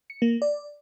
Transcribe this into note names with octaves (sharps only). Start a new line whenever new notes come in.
C#7
A#3
D5